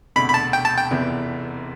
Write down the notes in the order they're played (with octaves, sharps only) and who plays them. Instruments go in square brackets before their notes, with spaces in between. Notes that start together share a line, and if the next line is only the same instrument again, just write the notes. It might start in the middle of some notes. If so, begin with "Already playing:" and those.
[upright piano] E1 D2 C3 [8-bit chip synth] B5
[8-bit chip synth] B5
A5
G5
A5
G5
[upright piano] F1 E2 C3 E3